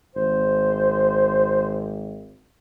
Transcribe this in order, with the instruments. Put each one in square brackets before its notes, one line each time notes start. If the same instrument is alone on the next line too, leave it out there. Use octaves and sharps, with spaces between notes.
[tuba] G#1 [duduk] C5